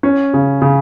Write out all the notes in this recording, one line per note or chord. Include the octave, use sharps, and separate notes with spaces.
C#4
C#3
C#3